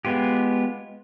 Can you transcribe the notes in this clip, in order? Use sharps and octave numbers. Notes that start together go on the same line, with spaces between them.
G#3 B3 F4 G4